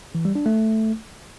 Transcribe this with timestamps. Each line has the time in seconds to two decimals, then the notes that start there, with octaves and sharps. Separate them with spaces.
0.15 E3
0.25 G3
0.35 D4
0.46 A3